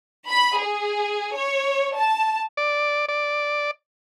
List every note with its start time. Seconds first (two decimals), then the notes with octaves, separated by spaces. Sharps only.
0.30 B5
0.60 G#4
1.37 C#5
1.98 A5
2.57 D5
3.08 D5